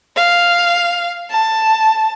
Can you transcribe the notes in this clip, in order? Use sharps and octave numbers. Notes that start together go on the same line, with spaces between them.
F5
A5